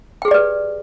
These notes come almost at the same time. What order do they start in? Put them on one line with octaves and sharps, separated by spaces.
G5 G#4 G4 D5 B4